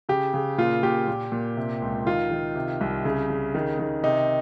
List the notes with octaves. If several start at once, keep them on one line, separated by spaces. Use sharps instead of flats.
C#3 G4
C#3
A#2 F4
A#2 G4
A#2
A#2
C3
C#2
D#3 F4
D#3
C3
C2
C#3
C#3
D#3
D#3
C3 D#4